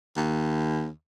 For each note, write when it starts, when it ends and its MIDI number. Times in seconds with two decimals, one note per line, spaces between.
0.16 0.90 39